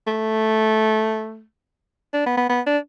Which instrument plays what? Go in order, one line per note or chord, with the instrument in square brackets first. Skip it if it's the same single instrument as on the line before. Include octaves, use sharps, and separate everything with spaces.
[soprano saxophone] A3
D4
B3
B3
B3
D4